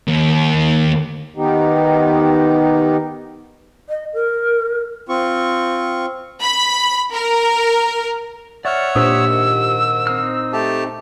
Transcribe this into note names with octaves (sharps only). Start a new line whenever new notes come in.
D#2
D#3 B3 D#4 G4
D#5
A#4
C4 F4 C#6
B5
A#4
C#5 D5 E5 F#5 F6
A#2 D4 G4 C5 D#6 E6
G#2 D#3
C4 D#4 F6
A3 G4 A5